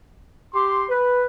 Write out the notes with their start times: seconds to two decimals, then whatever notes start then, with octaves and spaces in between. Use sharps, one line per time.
0.54 G4 C6
0.89 B4